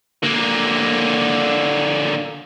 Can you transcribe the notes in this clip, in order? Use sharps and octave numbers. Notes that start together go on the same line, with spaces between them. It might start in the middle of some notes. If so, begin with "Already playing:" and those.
D3 A#3